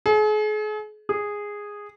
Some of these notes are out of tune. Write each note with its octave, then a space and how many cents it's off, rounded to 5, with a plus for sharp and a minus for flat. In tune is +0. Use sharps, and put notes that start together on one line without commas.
G#4 +40
G#4 -10